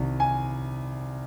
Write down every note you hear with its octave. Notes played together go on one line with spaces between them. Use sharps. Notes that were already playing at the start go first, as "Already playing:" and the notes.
Already playing: C2 C3 D#3
G#5